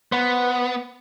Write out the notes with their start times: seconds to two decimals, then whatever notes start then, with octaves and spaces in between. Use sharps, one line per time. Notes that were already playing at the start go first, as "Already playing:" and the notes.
0.12 B3 C5 F#5 B5